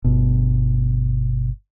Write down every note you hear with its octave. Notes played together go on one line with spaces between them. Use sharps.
G1 B2